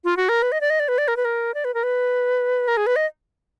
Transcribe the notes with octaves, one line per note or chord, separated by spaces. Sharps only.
F4
F#4
A#4
B4
D#5
D5
D#5
D5
B4
D5
A#4
B4
A#4
D5
B4
A#4
B4
A#4
G#4
B4
D#5